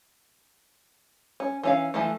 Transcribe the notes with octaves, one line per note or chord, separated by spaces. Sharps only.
C#4
E3 C#4 F5
E3 F3 A3